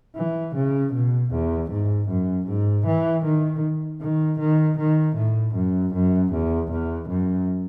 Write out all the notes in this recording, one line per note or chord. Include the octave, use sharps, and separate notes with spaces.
E3
C#3
B2
E2
G#2
F#2
G#2
E3
D#3
D#3
D#3
D#3
A2
F#2
F#2
E2
E2
F#2